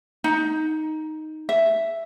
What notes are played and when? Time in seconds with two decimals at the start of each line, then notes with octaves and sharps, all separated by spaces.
0.24 D#4
1.49 E5